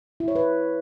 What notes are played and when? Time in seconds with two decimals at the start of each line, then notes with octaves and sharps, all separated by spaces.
0.20 E4
0.28 C#5
0.35 B4